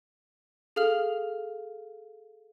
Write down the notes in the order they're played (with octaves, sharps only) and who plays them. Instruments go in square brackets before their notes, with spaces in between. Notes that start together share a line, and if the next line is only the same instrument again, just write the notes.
[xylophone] G#4 A4 F5 F6 F7